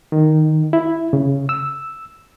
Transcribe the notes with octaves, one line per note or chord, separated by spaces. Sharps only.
D#3
E4
C#3
E6